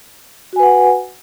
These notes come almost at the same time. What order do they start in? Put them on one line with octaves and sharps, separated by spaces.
F#4 G#5 B4 F#5